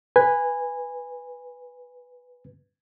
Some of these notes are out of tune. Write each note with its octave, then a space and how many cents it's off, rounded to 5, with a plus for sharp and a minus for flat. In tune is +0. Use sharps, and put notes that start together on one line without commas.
B4 +0 G#5 -15